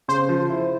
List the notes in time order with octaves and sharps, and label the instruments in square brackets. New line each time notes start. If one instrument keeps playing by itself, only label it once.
[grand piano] C#3 [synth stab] C5
[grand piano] F3
E4